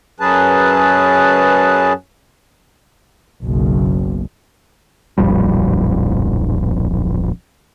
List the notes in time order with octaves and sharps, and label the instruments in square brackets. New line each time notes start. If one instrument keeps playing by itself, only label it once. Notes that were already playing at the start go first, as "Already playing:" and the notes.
[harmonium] F#2 F#3 C#4 G#4 B4 A5
[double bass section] F#1 B1
[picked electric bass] D1 A#1 F2 G3